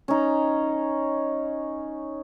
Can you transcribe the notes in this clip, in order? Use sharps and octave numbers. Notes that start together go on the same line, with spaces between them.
C#4 D#4